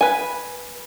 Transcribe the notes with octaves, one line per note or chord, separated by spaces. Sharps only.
B4 G#5